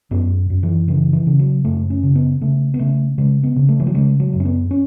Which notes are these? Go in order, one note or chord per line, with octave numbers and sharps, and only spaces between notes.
F#2 B3
F#2
E3
C#3 E3
E3
C#3
F#3
F#2 A3
C#4
C#3
B3
C#3 A3
B3
C#3 A3
C#3 G#3
B3
C#3
A3
E3
F#3
C#3 G#3
F#3
F#2
C#4
B3
C#4